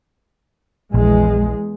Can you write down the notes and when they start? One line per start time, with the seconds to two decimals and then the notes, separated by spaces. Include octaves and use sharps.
0.94 A#1 E2 G#3